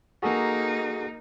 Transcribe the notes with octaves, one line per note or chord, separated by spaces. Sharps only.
A#3 D#4 F#4 G#4 A4